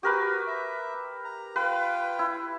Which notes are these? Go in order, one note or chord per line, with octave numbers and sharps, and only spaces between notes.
F#4 G4 A#4 B4
E5
A#5
F4 B4 F5 G5
E4